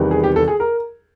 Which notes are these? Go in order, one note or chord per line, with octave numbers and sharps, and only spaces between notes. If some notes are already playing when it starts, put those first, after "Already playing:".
Already playing: E2 C3 D#3 G3 B3
G#4
G4
A4
G#4
A#4